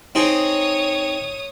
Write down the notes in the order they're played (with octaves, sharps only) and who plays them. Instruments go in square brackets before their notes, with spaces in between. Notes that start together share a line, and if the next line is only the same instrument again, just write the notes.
[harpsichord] C4 D#4 G#4 [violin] C#5 D#6